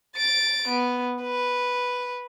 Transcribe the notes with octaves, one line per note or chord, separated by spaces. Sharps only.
A6 D7
B3
B4